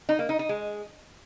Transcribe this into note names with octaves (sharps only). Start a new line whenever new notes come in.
D#4
A#3
D#4
D#4
G#3